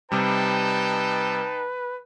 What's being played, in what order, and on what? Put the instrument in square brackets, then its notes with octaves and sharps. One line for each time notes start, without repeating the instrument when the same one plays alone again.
[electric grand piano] C3 G3 [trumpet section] D#4 G5 A5 [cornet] B4